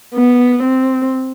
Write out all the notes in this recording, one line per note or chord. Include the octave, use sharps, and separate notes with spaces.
B3
C4